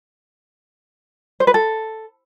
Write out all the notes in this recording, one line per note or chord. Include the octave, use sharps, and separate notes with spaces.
C5
B4
A4